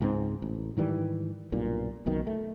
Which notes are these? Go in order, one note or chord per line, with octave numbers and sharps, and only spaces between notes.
C#2 G#2 C4
A1
G#2 D#3 E3 G3
B1 G2 A#2
F#1 B1 B2 D#3
A3